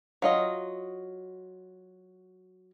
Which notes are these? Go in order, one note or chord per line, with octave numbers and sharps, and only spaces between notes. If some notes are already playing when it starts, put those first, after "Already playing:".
F#3 F4 D#5